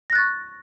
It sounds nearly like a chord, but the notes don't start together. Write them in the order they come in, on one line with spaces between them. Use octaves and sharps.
A#6 F#6 A6 C#6